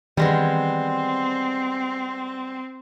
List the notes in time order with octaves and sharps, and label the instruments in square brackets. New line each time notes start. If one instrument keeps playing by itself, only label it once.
[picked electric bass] D#3 E3 [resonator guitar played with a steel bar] G3 G#3 B3 [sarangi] C4